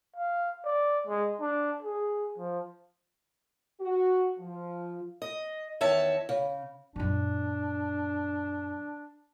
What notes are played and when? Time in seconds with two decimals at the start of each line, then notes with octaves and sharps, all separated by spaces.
0.16 F5
0.65 D5
1.07 G#3
1.41 D4
1.83 G#4
2.38 F3
3.81 F#4
4.39 F3
5.22 D#5
5.81 E2 D#3 C#5 E5 A5
6.29 C#3
6.96 F#2 A#2 D4